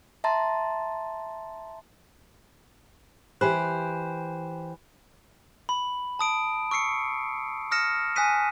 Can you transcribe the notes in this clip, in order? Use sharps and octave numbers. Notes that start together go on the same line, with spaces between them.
E5 A5 A#5 C6 A6
E3 G4 C5 G#5 B5 F#6
B5
A5 D#6 D7
C#6 E6 C7 C#7
D#6 F6 A#6 C#7 E7
G#5 D#6 F#6 B6 D#7